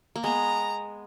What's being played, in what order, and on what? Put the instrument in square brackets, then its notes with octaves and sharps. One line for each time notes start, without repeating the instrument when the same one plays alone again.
[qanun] A#3
[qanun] G#3 B3 [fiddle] A#5